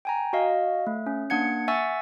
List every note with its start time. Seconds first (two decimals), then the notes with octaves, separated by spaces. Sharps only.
0.05 G5 G#5 A#5
0.33 F#4 D#5 F5
0.87 A3
1.06 C#4
1.30 A#3 D4 F#5 G#6 C#7
1.68 E5 F#5 G#5 C#6 E6 A6